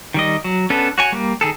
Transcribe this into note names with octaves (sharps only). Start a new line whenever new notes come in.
D#3 G3 D#5
F#3
B3 C#4 D4 A4 B4
F#4 C#5 G#5
G3 A#3
D#3 G#4 A4